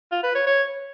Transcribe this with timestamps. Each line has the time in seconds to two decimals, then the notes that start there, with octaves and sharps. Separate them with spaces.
0.12 F4
0.23 B4
0.35 C#5
0.47 C#5